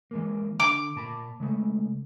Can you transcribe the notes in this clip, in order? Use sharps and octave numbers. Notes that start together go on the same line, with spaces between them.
E3 G#3 A#3
D3 D6
A#2 A5 B5
C#3 G#3 A3